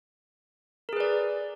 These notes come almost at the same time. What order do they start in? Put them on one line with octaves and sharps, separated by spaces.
A#4 G#4 B4 D5